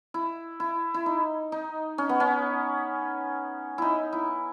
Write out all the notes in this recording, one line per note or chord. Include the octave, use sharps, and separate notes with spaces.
E4
E4
E4
D#4
D#4
C#4
B3
C#4
D#4 E4
E4